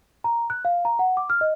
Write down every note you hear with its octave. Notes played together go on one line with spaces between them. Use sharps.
A#5
F#6
F5
A#5
F#5
D6
F6
D#5